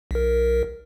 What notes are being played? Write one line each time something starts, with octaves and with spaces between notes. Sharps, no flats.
B1 A#4